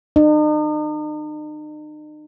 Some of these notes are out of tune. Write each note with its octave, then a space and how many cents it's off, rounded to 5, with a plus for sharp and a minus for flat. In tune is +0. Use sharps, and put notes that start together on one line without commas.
D#4 -45